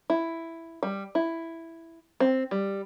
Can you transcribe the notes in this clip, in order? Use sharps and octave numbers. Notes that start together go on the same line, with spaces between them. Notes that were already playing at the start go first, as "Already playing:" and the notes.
E4
G3
E4
C4
G3